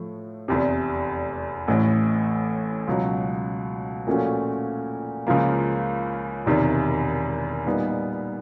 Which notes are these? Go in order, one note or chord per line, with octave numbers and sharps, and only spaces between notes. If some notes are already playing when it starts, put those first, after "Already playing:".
Already playing: A2 F3 A3
F1 E2 C3
A1 A2 E3
C#2 B2 F#3
A#2 F3 A3 C#4 F#4
C#2 C#3 F3 A#3
E1 E2 C3 D#3
A#2 G3 B3 D#4